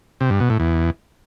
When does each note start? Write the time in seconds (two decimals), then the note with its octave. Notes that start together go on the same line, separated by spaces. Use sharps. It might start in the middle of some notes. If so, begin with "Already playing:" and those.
0.21 C3
0.30 G2
0.40 B2
0.50 A2
0.60 E2